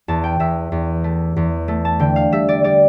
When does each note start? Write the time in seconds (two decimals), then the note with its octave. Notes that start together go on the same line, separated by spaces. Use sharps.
0.08 E2 A5
0.24 G5
0.40 E2 E5
0.72 E2
1.04 A3
1.36 E2
1.68 A3
1.85 A5
2.00 D3 G5
2.16 F5
2.32 G3 E5
2.49 D5
2.64 G3 D5